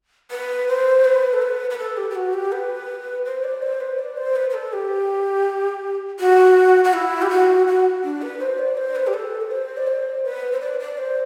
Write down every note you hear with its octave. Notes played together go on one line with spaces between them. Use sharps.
B4
C5
B4
A4
B4
B4
A4
G4
G4
F#4
G4
B4
C5
D5
C5
B4
D5
C5
B4
B4
A4
G4
F#4
F#4
E4
G4
F#4
F#4
D4
B4
C5
D5
C5
B4
G4
A4
B4
C5
D5
C5
B4
C5
D5
D5
C5